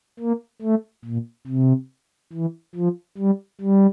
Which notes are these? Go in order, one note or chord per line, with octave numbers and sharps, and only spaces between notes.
A#3
A3
A#2
C3
E3
F3
G3
G3